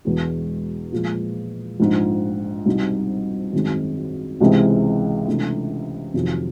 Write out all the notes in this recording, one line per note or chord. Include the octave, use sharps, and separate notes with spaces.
E1 E2 B2 G#3 B3
A#2 F3 G#3
A#1 G#2 F3
C2 B2 G3 C4 D#4
G#1 F#2 D#3 G#3 C4
C#2 C3 E3 G#3 C4
C#2 C3 E3 A3 D4
F2 C3 D#3 F#3